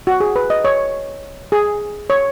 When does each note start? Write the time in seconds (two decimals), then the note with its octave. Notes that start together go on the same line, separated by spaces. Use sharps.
0.07 F#4
0.20 G#4
0.36 B4
0.50 D#5
0.65 C#5
1.52 G#4
2.10 C#5